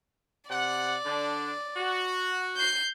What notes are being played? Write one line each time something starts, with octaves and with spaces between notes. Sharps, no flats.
C3 D5 F#5
D3 D4
F#4
G6 C7